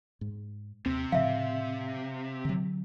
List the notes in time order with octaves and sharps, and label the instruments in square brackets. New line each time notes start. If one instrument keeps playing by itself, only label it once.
[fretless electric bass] G#2
[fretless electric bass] D#2 C4 [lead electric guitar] C3
[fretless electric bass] A2 C#3 F3 [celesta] E5 F5
[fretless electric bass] D3 F#3